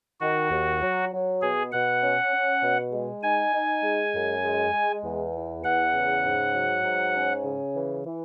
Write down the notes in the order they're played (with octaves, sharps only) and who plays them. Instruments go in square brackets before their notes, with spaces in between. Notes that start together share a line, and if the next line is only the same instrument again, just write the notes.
[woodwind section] D#3 [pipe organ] F#4
[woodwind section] D#2
F#3
F#3
[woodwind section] B2 [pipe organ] G#4
[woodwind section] B2 [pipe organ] F#5
[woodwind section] C#4
C#4
B2
G#3
[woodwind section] D#4 [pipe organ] G#5
[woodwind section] D#4
G#3
F#2
G#3
G#3
E2
E3
[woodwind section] E2 [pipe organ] F#5
[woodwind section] C#3
G#2
F#3
G#2
C#4
C#3
E3
E3